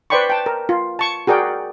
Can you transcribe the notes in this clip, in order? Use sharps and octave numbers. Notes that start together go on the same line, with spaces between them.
B4 C5 D5 G5 B5 C#6
G5 A5
A#4
F4
A5 C#6
F#4 G#4 A#4 D5 G5